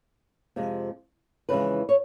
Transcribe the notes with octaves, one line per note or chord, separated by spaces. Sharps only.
F2 C3 F3 G#3
F2 C#3 E3 G#3 B4
C#5